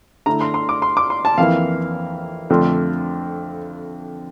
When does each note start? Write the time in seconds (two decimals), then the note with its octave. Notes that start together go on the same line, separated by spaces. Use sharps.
0.26 D3 A3 E4 A#5
0.41 C6
0.54 C6
0.69 D6
0.82 C6
0.97 D6
1.10 C6
1.25 A5
1.38 F2 E3 A#3 E4 F5
2.50 F2 D3 A3 D4 F4